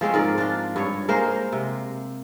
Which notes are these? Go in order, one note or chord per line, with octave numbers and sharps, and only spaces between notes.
F3 G#3 C4 C#4
G#2 A#4 D5
D4 F4
G2 C#5
G#3 A#3 A#4 C5
C3